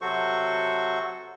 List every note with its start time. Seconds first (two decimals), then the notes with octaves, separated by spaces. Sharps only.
0.01 C3 F#3 F#4 A4 C5 C#6